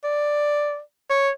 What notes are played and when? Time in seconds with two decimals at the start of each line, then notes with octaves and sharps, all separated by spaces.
0.04 D5
1.10 C#5